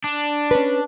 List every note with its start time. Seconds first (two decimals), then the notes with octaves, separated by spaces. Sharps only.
0.04 D4
0.51 C#4 B4